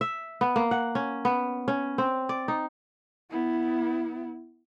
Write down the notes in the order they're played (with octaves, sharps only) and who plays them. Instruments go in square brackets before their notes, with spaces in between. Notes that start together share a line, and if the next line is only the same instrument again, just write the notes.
[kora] E5
B3
A#3
F#5
C#4
B3
C#4
C4
D5
D#4
[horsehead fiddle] B3 E4